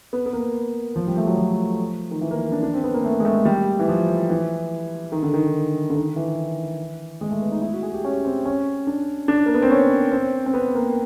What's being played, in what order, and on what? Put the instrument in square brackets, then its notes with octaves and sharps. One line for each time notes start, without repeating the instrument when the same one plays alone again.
[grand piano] B3
B3
A#3
F3
G3
A3
F#3
F3
D#3
E3
A#3
D4
D4
C4
B3
A#3
A3
G#3
A3
G3
E3
F3
E3
D#3
D3
D#3
D3
D#3
E3
G#3
A3
B3
D#4
E4
F#4
G#4
G4
C#4
C4
C#4
D4
D4
A#3
B3
C4
C#4
C4
C4
B3
A#3